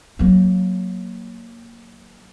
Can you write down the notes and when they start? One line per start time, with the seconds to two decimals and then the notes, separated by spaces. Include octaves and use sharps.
0.19 F#3 A#3